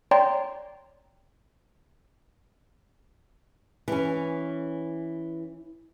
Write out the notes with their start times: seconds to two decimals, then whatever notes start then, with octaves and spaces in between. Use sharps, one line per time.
0.11 C#5 D5 G5 A#5 C6
3.88 E3 C#4